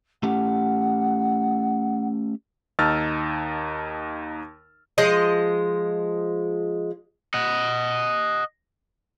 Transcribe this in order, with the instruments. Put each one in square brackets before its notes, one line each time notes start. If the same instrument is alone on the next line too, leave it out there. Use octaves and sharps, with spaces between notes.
[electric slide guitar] A3 C#4 G4 [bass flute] F#5
[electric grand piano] D#2 D#4 A5 E6 F6 A6
[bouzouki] F3 G#3 D#5
[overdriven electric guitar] D#5 F#5